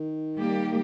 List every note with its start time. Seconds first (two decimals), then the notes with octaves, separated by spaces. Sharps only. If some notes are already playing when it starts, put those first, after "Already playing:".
Already playing: D#3
0.37 G3 A#3 G4